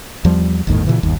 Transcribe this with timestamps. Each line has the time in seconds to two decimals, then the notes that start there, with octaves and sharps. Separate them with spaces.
0.25 E2 F3 G3
0.67 G1 D#2 A2 D#3
0.86 A#2 C#3 E3
1.03 G1 D#2